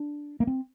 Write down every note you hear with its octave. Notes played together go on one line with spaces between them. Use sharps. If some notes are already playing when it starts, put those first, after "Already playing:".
Already playing: D4
A#3
C4